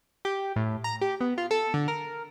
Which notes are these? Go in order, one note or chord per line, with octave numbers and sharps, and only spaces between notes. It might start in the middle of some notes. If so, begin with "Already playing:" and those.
G4
A2
A#5
G4
B3
F4
A4
D3
A#4